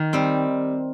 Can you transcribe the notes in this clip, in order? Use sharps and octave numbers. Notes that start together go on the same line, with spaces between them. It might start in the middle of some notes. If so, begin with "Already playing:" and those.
Already playing: D#3
G3 C4